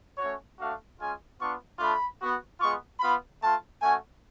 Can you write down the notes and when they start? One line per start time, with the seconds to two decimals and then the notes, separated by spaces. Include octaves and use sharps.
0.18 A3 C#4 F#4 C#5
0.58 A3 D4 F#4 F5
0.98 G#3 C#4 F4 G#5
1.38 B3 D4 F4 C#6
1.78 A3 D4 F4 B5
2.19 B3 F#4
2.59 G#3 B3 F4 C#6
2.99 B3 F4 B5
3.39 A3 F4 A5
3.80 A3 C#4 F#4 G#5